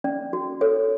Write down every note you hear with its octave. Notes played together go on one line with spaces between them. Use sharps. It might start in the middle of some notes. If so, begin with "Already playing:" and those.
C#4 D5
F#4
A4 C#5